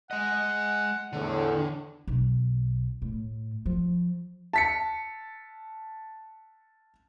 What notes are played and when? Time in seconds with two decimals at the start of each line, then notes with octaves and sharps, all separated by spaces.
0.11 G#3 D#5 F#5
1.13 E2 A2 D3
2.07 B1
3.02 A2
3.66 F3
4.53 A5 B6 C#7